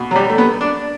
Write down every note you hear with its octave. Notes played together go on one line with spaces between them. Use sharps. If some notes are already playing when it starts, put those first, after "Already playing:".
Already playing: B2
F#3
G3
A3
B3
D4